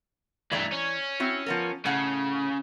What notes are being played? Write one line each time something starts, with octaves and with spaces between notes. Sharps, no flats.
G2 E3 A3 D5 A#5
C#4
C4 E4 F#4
F3 B3 A#4
A2 C#3 F#5